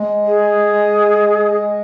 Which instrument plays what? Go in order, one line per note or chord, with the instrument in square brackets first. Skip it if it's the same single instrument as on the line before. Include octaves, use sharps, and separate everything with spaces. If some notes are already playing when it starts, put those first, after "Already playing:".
Already playing: [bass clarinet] G#3
[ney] G#4